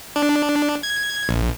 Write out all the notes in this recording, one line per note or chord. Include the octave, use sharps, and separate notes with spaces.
D4
G#6
A#1